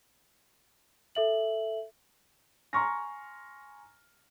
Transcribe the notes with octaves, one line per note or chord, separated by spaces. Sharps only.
A4 E5 F#7
G#5 A#5 C6 C#6 F6 A#6